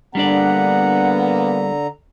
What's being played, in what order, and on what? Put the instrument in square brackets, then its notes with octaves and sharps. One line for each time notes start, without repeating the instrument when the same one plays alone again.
[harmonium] D3 A#5 [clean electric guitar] G3 D4 D5 [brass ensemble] A#3 B3 [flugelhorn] F#5